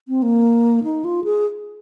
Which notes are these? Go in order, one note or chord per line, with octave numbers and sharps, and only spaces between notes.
C4
A#3
D#4
F4
G#4